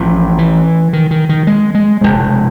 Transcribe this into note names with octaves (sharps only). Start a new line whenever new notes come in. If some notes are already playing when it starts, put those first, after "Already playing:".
Already playing: A1 A2 F3
E3
D#3
D#3
D#3
G#3
G#3
F1 E2 B2 G#3